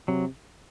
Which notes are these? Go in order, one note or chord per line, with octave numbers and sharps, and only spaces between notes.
C3 F#3